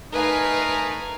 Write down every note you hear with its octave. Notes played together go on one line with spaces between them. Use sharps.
A3 D#4 A#4 B4 F5 G#5